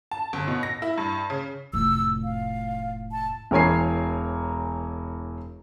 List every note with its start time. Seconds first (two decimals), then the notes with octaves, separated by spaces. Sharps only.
0.11 A5
0.33 G1
0.48 B2
0.63 A#6
0.82 E4
0.98 G2
1.30 C#3
1.73 F1 A2 E6
2.24 F5
3.11 A5
3.51 E1 E3 A#4 C#5 G#5 C7